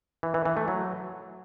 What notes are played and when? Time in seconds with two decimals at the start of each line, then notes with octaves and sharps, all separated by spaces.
0.23 E3
0.34 E3
0.45 E3
0.57 A3
0.68 F#3